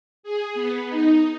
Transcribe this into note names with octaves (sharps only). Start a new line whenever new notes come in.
G#4
B3
D#4